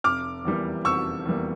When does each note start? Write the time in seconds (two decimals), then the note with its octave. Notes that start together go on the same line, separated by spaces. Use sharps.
0.04 F1 D6 F6
0.45 E2 E3 G3 A#3
0.85 F1 C#6 E6
1.26 E2 E3 G3 A#3